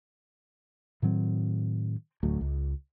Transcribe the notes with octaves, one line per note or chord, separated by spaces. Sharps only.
A2 D#3 F#3 C4
D1 D2 F#3 A3
C#2